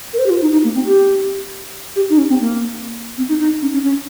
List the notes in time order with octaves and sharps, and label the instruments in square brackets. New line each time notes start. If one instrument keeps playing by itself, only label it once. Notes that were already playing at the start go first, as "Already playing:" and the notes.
[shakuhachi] A#4
C5
G4
F4
D#4
D#4
A#3
C4
G4
G4
D#4
C#4
C4
A#3
C4
D#4
D#4
C#4
C#4
C#4